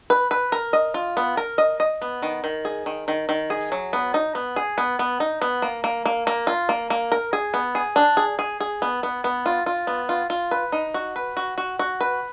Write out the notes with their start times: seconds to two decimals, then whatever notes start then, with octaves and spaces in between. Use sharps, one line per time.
0.10 B4
0.31 B4
0.52 A#4
0.73 D#5
0.94 F4
1.17 B3
1.37 A#4
1.58 D#5
1.80 D#5
2.02 B3
2.23 D#3
2.44 D#3
2.65 G#4
2.86 D#3
3.08 D#3
3.29 D#3
3.50 G#4
3.72 F#3
3.93 B3
4.14 D#4
4.35 B3
4.56 G#4
4.78 B3
4.99 B3
5.20 D#4
5.42 B3
5.62 A#3
5.84 A#3
6.06 A#3
6.27 A#3
6.47 F4
6.69 A#3
6.90 A#3
7.12 A#4
7.33 G#4
7.54 B3
7.75 G#4
7.96 D4
8.17 G#4
8.39 G#4
8.61 G#4
8.82 B3
9.03 B3
9.24 B3
9.46 F4
9.66 F4
9.87 B3
10.09 F4
10.30 F4
10.51 B4
10.72 D#4
10.94 F#4
11.16 B4
11.37 F#4
11.58 F#4
11.79 F#4
12.01 B4